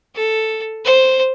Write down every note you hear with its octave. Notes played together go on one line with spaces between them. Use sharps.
A4
C5